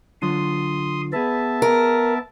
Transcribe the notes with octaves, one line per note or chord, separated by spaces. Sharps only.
D3 F#3 F4 C6 D#6
B3 G#4 B4 E5 A5
A#4